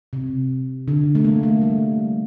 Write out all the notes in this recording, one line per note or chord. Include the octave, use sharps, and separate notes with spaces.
C3
D3
A3
A#3
A3
G3